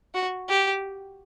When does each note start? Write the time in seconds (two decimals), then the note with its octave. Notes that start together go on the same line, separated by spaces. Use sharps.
0.14 F#4
0.49 G4